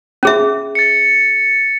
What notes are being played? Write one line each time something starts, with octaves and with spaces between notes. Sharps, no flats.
C#4 G#4 E5
A6 C#7